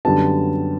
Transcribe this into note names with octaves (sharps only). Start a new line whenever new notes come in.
F#2 D3 G3 B3 A5